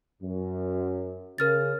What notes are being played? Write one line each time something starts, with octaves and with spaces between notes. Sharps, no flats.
F#2
C#3 A#4 F6 A6